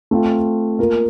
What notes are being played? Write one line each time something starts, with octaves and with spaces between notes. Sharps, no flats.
A3 C4 F4
A#3 F4 A#4